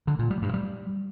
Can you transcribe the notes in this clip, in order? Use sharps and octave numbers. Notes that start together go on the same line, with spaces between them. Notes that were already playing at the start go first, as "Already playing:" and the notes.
D3
A#2
G3
G2
G3